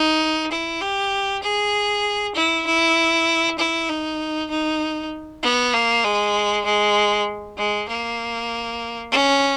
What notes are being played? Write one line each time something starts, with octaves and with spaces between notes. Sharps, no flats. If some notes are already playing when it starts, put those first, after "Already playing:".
Already playing: D#4
E4
G4
G#4
E4
E4
E4
D#4
D#4
B3
A#3
G#3
G#3
G#3
A#3
C#4